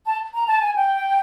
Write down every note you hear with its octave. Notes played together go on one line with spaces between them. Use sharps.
A5
A#5
A5
G#5
G5